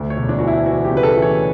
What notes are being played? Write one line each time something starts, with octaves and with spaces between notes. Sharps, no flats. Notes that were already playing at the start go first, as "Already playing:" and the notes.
Already playing: D2
C#5
E1
D4
E3 F#4
E4
E3 F#4
G4
C#3
B4
A4
E3
C#5